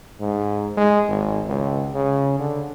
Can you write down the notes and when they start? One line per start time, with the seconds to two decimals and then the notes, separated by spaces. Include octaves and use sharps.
0.20 G#2
0.77 G#3
1.08 G#1
1.48 C#2
1.94 C#3
2.39 D3